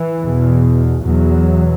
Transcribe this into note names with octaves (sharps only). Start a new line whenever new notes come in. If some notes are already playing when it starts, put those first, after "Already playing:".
Already playing: E3
E2 B2
E2 B2 F#3